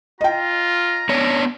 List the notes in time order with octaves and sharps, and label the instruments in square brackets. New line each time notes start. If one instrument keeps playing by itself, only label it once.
[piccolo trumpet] F4 [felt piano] D#5 G5 [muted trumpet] A#5
[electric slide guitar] B3 D4 C#5